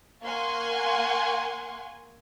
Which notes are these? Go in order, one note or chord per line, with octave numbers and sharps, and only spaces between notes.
A#3 F5 F#5 G#5 C6 C#6